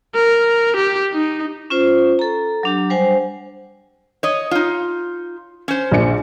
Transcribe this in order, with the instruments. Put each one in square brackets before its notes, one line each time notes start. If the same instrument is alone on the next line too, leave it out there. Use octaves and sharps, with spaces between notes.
[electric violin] A#4
G4
D#4
[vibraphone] C#4 F4 C5
A4 A#5
F#3 D4 G4
G3 C5 F#5 G#5
[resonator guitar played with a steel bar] C#5 D#5
D#4 F4
C#4 C5
[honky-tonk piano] A#1 D4 C#7